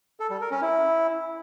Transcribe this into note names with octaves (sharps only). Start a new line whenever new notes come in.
A4
G3
A#4
C#4
E4